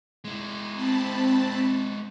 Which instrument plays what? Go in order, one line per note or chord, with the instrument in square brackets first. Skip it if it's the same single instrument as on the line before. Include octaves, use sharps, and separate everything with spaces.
[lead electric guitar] G#3 E4
[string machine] C4 A5 B5